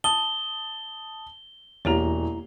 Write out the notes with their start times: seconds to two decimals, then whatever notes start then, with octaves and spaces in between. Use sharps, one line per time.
0.04 A5 D#6 G7
1.85 E1 E2 A#3 E4 G4 C#5 A#5 F7